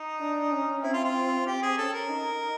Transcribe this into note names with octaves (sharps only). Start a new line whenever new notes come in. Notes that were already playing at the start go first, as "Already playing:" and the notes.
Already playing: D#4
D4
C#4
C4 E4
F4
F4
C4 G4
G#4
C#4 A4
A#4
D#4